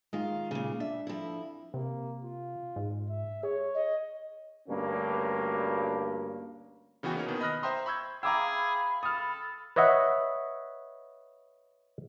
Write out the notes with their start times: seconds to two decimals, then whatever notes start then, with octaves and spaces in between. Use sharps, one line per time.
0.13 D#3 G#3 F4
0.51 A#2 C#3
0.80 D4 E5
1.07 F2 E4
1.74 C3 A#3
2.24 F4
2.76 G#2
3.09 E5
3.43 G#4 C#5
3.75 D#5
4.69 D2 G2 A#3 C#4
7.03 C#3 E3 B3 F#4 G5 G#5
7.14 A#3 C#4 D#4 C#5
7.26 B2 D#3 B3
7.41 D#5 B5 D#6 F6 F#6 A#6
7.63 C5 E5 G5 A#5 C6 D#6
7.86 B5 C#6 E6 G6 G#6
8.23 G#4 E5 F5 G5 A#5 B5 D6 E6
9.03 A4 D#6 F6
9.76 B4 C#5 D#5 E5 F#5